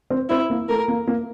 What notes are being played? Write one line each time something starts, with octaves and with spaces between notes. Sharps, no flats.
C4
C4 E4
A#3
A3 A#4
A#3
A#3